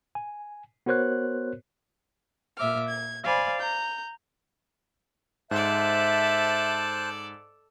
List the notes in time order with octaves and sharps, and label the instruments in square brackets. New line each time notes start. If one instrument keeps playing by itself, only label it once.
[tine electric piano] G#5
B3 F#4 A#4 C5 C#5 F#6
[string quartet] A#2 E5 D6 F6
G#6
C5 D5 F5 G#5 B5
A#5 G6
[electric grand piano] G#2 [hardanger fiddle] A4 D5 [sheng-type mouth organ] C5 A5 F#6 [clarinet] E5